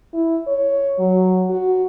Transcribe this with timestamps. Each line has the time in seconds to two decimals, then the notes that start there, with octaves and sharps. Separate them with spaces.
0.14 E4
0.47 C#5
0.99 F#3
1.50 F#4